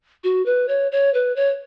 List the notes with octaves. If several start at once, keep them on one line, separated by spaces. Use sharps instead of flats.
F#4
B4
C#5
C#5
B4
C#5